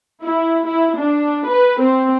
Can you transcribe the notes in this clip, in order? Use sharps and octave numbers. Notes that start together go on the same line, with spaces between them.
E4
E4
D4
B4
C4